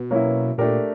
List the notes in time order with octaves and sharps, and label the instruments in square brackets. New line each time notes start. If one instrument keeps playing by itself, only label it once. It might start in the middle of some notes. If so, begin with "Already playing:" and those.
Already playing: [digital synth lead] B2
[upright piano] F#3 A#3 C#4 E4
[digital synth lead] A#2 [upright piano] A3 D4 G4 A#4